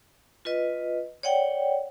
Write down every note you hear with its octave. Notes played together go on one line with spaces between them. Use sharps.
F4 B4 D#5
C#5 D5 F#5 G5